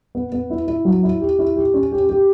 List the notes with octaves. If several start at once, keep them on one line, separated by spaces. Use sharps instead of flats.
B3
B3
E4
E4
F#3
E4
G4
E4
G4
C#4
G4
G4